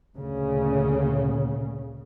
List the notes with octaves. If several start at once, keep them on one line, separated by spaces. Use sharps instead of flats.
D2 A#2 C#3